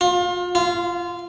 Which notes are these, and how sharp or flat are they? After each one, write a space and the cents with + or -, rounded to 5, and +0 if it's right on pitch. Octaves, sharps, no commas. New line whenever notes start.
F4 +30
F4 -20